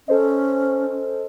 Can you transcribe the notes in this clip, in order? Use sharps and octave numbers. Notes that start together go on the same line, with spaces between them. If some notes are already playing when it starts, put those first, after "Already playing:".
C#4 A4 C5 D#5